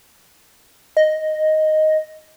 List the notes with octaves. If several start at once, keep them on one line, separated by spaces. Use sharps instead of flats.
D#5